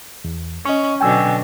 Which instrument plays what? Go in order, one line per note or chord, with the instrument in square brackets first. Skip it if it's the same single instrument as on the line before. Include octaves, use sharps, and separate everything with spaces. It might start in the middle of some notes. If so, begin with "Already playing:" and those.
[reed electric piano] E2
[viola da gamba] C#4 [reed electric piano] D#5 C#6
[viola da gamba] B2 D3 F#3 [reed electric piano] G5 G#5 E6